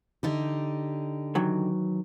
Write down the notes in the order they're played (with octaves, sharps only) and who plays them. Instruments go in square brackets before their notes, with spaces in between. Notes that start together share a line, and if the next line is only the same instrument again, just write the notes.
[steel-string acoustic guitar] D3 D#4 G4
[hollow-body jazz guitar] D#3 E3 F#3